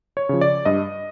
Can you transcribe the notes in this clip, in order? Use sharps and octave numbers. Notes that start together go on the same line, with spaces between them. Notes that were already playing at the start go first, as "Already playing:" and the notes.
C#5
C#3 F3
D5
G2 D#5